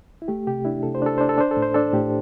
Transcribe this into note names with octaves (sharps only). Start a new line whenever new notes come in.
E4
A3 G4
C3 G4
D4 E4
C3 A4
C5
D4 A4
D4 C5
A4
D4 C5
A4
A2
C5
D4 A4
A2 G4